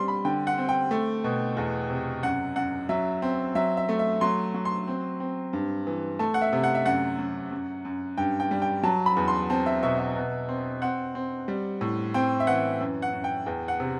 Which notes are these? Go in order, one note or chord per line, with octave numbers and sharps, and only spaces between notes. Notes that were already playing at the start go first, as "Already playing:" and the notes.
Already playing: G3 C4 C6
B5
D3 G5
F#5
C4
G5
A3
B2
E2
C3
F#2 F#5
F#2 F#5
F#3 E5
C4
F#3 E5
E5
A3
E5
F#3 C6
F#3
C6
C4
C4
G2
E3
A3 A5
F#5
E5
C3
F#5
E5
F#2 F#5
F#2
F#2
F#2
G2 G5
G5
G3
G5
F#3 A5
B5
E2
C6
C4 A5
E5
B2 E5
E5
B2
C4
C4 F#5
C4
G3
A2
C4 G5
E5
E3 F#5
F#2
F#5
F#2
G5
E2 G5
F#5
C3